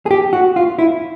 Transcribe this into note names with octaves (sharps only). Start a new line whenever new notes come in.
G#4
G4
F#4
F4
E4